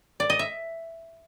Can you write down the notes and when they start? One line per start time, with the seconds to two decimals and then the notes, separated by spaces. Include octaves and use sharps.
0.20 D5
0.30 D#5
0.39 E5